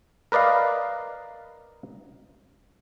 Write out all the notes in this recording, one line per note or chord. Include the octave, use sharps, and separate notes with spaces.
A#4 B4 D5 D#5 F5